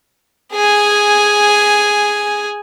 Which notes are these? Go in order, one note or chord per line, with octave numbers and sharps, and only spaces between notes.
G#4 G#5